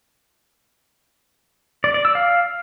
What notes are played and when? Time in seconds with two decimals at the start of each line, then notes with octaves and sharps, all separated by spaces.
1.84 D5
1.94 D5
2.05 E6
2.15 F5